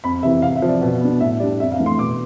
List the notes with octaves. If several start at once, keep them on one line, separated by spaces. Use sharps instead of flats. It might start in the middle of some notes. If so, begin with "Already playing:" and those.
F2 B5
C3 E3 E5
C3 F5
E5
F3 C4
D5
B2
B3 D4
A2 E5
G3 D4 D5
F2 E5
F5
E3 A3 D4
C6
B2 D6